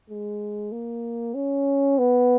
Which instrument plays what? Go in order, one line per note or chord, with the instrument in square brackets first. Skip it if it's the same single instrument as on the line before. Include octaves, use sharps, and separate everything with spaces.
[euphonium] G#3
A#3
C#4
B3